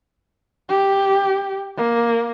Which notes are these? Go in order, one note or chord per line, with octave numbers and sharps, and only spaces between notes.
G4
A#3